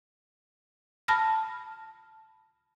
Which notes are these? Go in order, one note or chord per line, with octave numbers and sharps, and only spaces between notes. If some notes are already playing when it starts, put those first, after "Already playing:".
A5 B5 F6 A#6